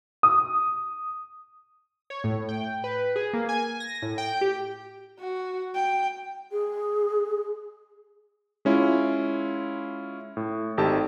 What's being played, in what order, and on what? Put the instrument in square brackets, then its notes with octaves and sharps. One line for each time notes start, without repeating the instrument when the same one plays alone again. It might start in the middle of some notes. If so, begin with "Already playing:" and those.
[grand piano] D#6
[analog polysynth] C#5
A2
G5
B4
G#4
A#3
G#5
A#6
A2
G5
G4
[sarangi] F#4
G5
[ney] G#4
[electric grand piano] G#3 C#4 E4 F4
A2
G#1 D#4 G4 A4 A5